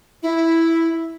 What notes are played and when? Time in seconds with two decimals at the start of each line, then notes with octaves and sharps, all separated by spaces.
0.23 E4